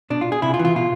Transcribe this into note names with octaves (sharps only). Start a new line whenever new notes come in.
B2 D4
F4
G#4
C3 E4
F4
E3
F4
B2 F4